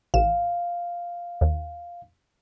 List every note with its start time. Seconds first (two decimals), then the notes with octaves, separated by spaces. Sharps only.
0.14 A1 F5 E7
1.41 D#2